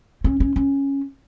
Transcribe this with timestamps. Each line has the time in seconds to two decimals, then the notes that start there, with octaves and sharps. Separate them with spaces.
0.24 C#4
0.40 C#4
0.56 C#4